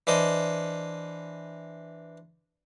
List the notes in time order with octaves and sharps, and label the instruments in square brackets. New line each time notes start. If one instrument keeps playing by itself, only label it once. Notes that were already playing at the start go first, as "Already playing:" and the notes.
[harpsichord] E3 D4 C5 D#5